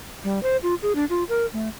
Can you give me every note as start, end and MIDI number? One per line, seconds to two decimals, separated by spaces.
0.24 0.42 55
0.43 0.57 72
0.63 0.75 65
0.82 0.95 68
0.95 1.05 62
1.10 1.24 65
1.29 1.46 70
1.53 1.68 57